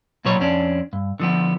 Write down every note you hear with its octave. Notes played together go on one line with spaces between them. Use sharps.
B1 A#2 F#3 B4 C#5
F2 C#4 D4
G2
D3 F3 B3